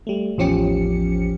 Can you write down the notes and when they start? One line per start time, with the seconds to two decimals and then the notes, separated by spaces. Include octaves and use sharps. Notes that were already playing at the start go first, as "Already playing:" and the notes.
0.07 G3 A3
0.38 A1 E2 F3 C#4 G4 C#7